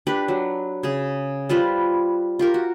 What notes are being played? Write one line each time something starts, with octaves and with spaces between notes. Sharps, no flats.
D4 G4 B4
F#3
C#3 G#4
G3 F4 B4 C5
F4 G4 A#4
F#4